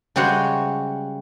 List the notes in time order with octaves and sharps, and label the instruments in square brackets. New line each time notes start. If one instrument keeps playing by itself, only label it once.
[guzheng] C#3 G3 G#3 F#4 C5 C#5